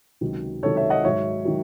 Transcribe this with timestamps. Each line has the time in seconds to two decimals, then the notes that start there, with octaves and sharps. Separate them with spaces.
0.21 C#2 C3 D#3 F#3
0.63 C#2 C3 D#3 F#3 A4 C#5
0.77 C#5 E5
0.90 D#5 F#5
1.04 G#2 D#3 F#3 C#5 E5
1.45 D#3 F#3